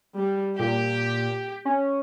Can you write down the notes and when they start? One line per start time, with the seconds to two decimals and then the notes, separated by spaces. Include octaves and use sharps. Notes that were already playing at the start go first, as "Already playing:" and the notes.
0.16 G3
0.59 A#2 G4
1.65 C#4